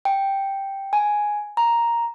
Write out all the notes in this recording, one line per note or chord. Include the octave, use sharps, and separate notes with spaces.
G5
G#5
A#5